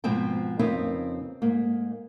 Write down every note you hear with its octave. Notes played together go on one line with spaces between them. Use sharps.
G#2 B2 F3 C4 G5
F2 C#3 C4 D#4 A#4 B4
G#2 A#3